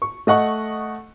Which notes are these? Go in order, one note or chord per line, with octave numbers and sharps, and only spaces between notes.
C#6
A3 D#5 F#5 C#6